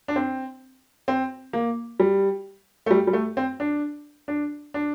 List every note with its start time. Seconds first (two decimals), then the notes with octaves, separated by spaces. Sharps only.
0.08 D4
0.16 C4
1.08 C4
1.53 A#3
2.00 G3
2.86 A3
2.91 G3
3.07 G3
3.13 A3
3.37 C4
3.60 D4
4.28 D4
4.74 D4